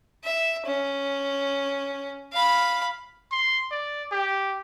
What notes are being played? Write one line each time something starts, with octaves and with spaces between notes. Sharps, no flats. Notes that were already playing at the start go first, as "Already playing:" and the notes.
E5
C#4
F5 B5
C6
D5
G4